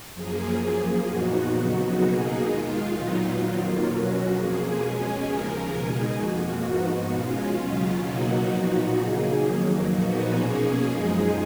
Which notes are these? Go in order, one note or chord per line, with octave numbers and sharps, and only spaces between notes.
F#2 F3 A#3 G#4
F#2 F3 A#3
A#2 F3 B3 D#4 F#4
F2 C#3 F#3 B3 D#4
B2 A#3 D#4 G#4
D#2 D#3 G#3 F4
A#2 F#3 B3 D#4
F2 D#3 F#3 A#3
B2 F#3 C#4 F#4
F2 F3 A#3 G#4
B2 G#3 C#4
D#2 C#3 F3 A#4
B2 G#3 D#4 G#4
F2 F3 A#3 F#4
G#2 F3 B3 D#4
B2 G#3 C#4 F4
D#2 C#3 F#3 C#4
B2 F#3 A#3 D#4 F#4
A#2 F3 B3 D#4
C#3 F#3 A#3 D#4 G#4
F2 D#3 F#3 A#3
A#2 F3 B3 D#4 F#4
B2 A#3 C#4 G#4
F#2 F3 G#3 D#4